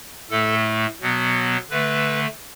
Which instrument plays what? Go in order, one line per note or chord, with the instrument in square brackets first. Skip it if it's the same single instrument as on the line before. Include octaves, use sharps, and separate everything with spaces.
[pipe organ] A2 A3 A4
B2 F#3 B3
D3 A3 B4